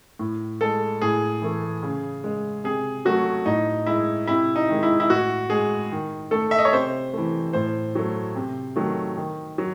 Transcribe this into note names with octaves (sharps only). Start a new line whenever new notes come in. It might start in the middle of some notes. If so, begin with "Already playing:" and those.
A2
G#3 A4
A2 G#4
E3 A3
C#3
G#3
C3 G#4
F#3 A3 F#4
A2 D#4
G#3 E4
C3 E4
D#4
D#3 G#3
E4
E4
A2 F#4
G#3 G#4
D#3
A3 A4
E5
D#5
C#5
C3 C5
E3 A3
A2 C5
F#3 A3
C3
D#3 F#3 A3
D#3
F#3